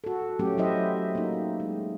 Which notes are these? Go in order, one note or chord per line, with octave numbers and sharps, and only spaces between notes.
F#4 A4
F#3 A3 C#4 G4
F#3 E4 C5 D#5 E5
A#3 D#4
G#3